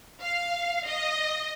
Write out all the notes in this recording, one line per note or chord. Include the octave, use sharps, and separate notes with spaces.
F5
D#5